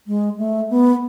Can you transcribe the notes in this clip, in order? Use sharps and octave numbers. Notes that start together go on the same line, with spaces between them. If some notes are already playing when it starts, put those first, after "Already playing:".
G#3
A3
B3